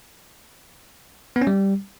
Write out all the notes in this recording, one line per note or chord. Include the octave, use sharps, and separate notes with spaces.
B3
C#4
G3